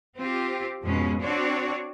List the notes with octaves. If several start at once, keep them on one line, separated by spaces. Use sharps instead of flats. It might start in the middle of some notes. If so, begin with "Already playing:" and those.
C4 F4 G4
F2 G#2 B2 G#3 C#4
C4 D4 F#4 C#5 D5